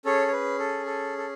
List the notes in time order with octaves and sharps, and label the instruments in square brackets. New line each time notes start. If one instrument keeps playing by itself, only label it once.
[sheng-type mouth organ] C#4 G#4 A4 C#5
C#5
B4
A4
A4
A4